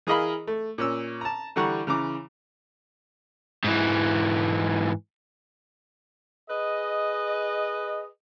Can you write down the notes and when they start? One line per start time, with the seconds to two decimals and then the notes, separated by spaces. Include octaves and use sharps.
0.07 E3 G#4 A#4 D#5 F5 B5
0.47 A3
0.78 A#2 C#4 E6
1.21 A5 A#5
1.56 D3 E3 G3 F#5 A#5 C#6
1.87 C#3 E3 A#5 D6
3.64 G#2 E3
6.49 G#4 B4 D#5